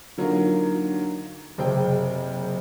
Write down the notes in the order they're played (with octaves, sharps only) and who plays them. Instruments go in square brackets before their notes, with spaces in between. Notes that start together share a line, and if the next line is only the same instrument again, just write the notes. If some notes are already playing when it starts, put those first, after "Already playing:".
[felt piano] D3 F#3 A#3 D#4 F4 A#4
F#1 C3 C4 G#4 G5